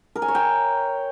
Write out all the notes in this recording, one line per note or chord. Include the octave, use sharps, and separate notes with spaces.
A#4
G#5
C#5
G5